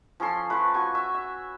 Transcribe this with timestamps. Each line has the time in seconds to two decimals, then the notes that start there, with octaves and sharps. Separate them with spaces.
0.20 F3 C#4 A4 C6
0.50 F3 A3 B4
0.74 F#4 G#5 C#6
0.95 E5
1.14 E5